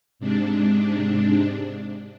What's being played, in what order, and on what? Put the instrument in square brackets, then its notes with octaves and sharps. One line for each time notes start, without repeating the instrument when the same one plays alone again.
[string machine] G#2 C3 D4